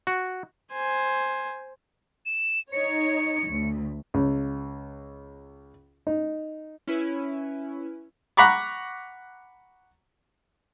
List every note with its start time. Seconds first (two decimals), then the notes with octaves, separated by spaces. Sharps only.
0.07 F#4
0.72 C5 G#5
2.26 E7
2.72 D#4 C#5 C#7
3.48 D2
4.14 C#2
6.07 D#4
6.88 C#4 E4 B4
8.37 F#5 A#5 B5 C#6 D6